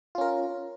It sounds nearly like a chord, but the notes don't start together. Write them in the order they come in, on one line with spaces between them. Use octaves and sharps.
F4 C#4 A#4